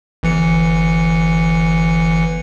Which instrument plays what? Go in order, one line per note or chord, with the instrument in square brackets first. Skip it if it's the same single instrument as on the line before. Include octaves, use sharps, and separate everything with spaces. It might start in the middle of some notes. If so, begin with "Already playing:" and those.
[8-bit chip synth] G1 E3 C#7